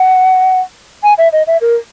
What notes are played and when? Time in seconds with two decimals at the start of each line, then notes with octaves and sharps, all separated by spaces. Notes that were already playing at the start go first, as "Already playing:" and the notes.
Already playing: F#5
1.03 G#5
1.18 E5
1.33 D#5
1.47 E5
1.61 A#4